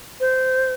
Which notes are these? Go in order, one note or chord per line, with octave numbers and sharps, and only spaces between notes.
C5